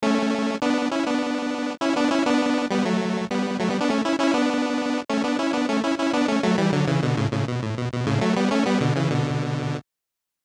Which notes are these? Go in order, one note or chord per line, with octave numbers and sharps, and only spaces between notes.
A3 C#4
B3 D4
C#4 E4
B3 D4
C#4 E4
B3 D4
C#4 E4
B3 D4
G3 B3
F#3 A3
G3 B3
F#3 A3
G3 B3
B3 D4
A3 C#4
C#4 E4
C#4 E4
B3 D4
A3 C#4
B3 D4
C#4 E4
B3 D4
A3 C#4
C#4 E4
C#4 E4
B3 D4
A3 C#4
F#3 A3
E3 G3
D3 F#3
C#3 E3
B2 D3
A2 C#3
A2 C#3
B2
A2
B2
B2
A2 C#3
F#3 A3
G3 B3
A3 C#4
G3 B3
B2 D3
C#3 E3
B2 D3